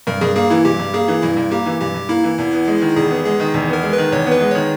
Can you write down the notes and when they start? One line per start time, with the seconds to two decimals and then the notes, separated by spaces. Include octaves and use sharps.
0.07 G2 A#4
0.21 G2 G#4
0.36 A#3 G#4
0.50 E3 E4
0.65 G2 G4
0.79 G2
0.94 A#3 G#4
1.08 E3
1.22 G2 E4
1.37 G2
1.51 A#3 G4
1.66 E3
1.81 G2 G4
1.94 G2
2.09 A#3 E4
2.24 E3
2.38 E2
2.53 B3
2.67 G#3
2.82 D#3
2.96 E2 G#4
3.10 B3
3.24 G#3 G#4
3.40 D#3
3.54 E2
3.68 B3 A#4
3.83 G#3
3.93 D#3 B4
4.12 E2 C#5
4.26 B3
4.32 B4
4.40 G#3
4.51 D#3 C#5